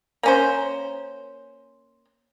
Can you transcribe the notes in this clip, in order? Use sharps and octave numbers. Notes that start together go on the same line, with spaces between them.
A#3 C#4 C5